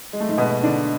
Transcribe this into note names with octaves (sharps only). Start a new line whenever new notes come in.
G#3
A3
G#2 G#3
B2 B3
D3 D4